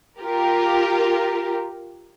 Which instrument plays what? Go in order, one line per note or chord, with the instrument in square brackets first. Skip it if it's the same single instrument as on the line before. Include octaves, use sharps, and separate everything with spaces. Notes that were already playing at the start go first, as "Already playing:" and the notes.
[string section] F4 G4 A#4